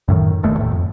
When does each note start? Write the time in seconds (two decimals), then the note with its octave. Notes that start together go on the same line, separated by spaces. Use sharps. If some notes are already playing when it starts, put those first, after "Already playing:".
0.08 F#2 A2 D#3
0.43 E1 D#2 A3
0.57 E2 A2
0.72 F2